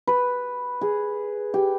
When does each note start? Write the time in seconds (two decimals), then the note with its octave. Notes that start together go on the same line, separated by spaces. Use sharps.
0.07 B4
0.81 G#4
1.54 G4